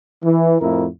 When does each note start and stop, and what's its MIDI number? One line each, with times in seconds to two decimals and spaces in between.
0.24 0.56 52
0.61 0.86 41
0.61 0.86 45
0.61 0.86 64
0.61 0.86 70